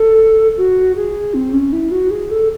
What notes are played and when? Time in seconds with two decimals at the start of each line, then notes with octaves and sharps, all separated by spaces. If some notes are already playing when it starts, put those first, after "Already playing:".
Already playing: A4
0.57 F#4
0.96 G#4
1.34 C4
1.53 C#4
1.72 E4
1.91 F#4
2.11 G#4
2.31 A4